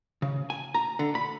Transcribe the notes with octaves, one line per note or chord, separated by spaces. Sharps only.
C#3
G#5
A#5
D3
B5